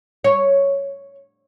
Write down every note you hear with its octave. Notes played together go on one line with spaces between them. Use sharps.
C#5